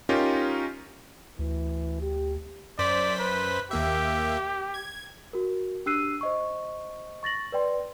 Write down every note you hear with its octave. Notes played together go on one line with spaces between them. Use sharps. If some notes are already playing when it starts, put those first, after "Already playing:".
C#4 D#4 F4 G4 A#4
D2 E3
G4
F#2 C5 D5 B6
B4
D#2 A#3 G4 E5
G#6
F#4 A#4
D4 G4 E6 F#6 C7 D#7
C5 D#5 C#6
C#6 A6 A#6 F#7
B4 D5 G5 C6